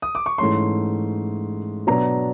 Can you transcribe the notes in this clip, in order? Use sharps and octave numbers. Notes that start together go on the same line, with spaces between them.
D#6
D6
C#6
G#2 E3 A3 C#4 C6
B2 F#3 B3 D4 A#5